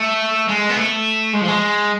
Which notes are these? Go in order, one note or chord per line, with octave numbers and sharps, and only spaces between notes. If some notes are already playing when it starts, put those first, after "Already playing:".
Already playing: A3
G#3
B3
A3
G#3
F3
G#3